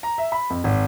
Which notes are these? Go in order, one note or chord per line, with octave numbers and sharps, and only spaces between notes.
A#5
E5
B5
F2
G#1